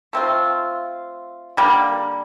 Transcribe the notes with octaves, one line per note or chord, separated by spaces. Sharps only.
A3 C4 F4
D3 G3 A#3